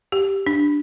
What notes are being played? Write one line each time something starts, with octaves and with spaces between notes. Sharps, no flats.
G4
D4